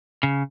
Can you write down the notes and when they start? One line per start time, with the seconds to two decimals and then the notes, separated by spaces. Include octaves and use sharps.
0.23 C#3